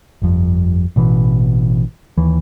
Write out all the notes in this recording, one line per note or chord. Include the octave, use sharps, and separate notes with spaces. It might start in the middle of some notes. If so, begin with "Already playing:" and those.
G1 F2
A1 B2 E3
D#2 E3